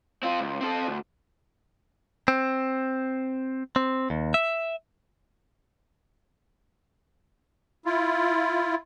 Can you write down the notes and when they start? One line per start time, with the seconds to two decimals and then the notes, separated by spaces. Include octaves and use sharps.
0.23 C4 F4
0.40 C#2
0.61 C4 A4
0.87 D2
2.28 C4
3.76 C4
4.10 D#2
4.34 E5
7.85 E4 F4